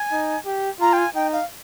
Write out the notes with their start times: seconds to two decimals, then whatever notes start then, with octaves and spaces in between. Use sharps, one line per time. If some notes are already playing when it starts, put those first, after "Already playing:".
Already playing: G#5
0.12 D#4
0.46 G4
0.80 F4 A#5
0.93 G5
0.98 G#5
1.15 D#4 G5
1.33 F5